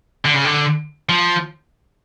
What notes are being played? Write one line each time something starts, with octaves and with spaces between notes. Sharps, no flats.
D3
C#3
D3
F3